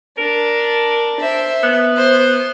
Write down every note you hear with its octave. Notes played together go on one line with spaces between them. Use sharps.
D4 A#4
C5 E5
B3
C5